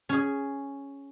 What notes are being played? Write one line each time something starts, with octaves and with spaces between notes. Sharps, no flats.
C#4 G#4